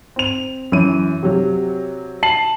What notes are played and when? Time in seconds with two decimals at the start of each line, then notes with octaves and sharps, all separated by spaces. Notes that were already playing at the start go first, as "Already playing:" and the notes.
0.16 C4 F7
0.72 F#2 E3 C#5 D#7
1.23 C3 F#3
2.23 A5 C7 F#7